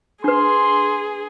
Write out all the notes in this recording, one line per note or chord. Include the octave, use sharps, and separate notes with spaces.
D4 G#4 B4 C6